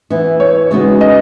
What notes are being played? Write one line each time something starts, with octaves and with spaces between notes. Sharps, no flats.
E3 B3 E4
C#5
C#3 G#3 B3 D#4 F#4
D#5